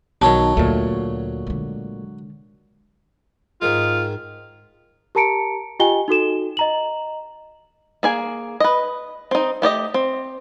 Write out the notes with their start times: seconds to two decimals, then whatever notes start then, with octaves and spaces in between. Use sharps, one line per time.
0.21 B1 D#3 F#3 C#5 A5
0.57 D2 A#2 A3
1.47 D3 G#3
3.62 G#2 D#3 G#3 F4
5.15 G4 A#4 A5 A#5 C#7 D7
5.80 F4 G4 D#5 G5 G#5 G7
6.08 D#4 F#4 A4 E7
6.57 D#5 A#5 F#7
8.03 A#3 G#4 G#5
8.60 B4 D#5
9.31 C4 D#4
9.62 A3 G4 D5 D#5
9.94 C4